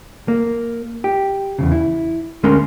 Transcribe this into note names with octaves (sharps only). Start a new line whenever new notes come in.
A#3
G4
E2 G2 C#3
E4
D2 G#3 C#4 A#4 C6